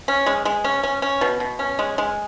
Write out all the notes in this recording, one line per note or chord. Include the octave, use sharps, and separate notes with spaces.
C#4
G#3
G#3
C#4
C#4
C#4
B2
B2
C#4
G#3
G#3